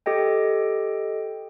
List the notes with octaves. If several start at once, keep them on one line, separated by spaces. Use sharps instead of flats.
G4 A4 D#5 G5